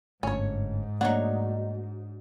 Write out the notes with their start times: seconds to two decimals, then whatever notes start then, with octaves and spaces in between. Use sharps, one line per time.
0.23 G1 G#2 A3 C#4 C#5
1.01 F#3 A3 A#3 D4 D#4 C#5 F#5